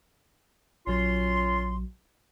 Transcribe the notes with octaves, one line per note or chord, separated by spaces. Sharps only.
A#1 F#3 C#4 F4 C6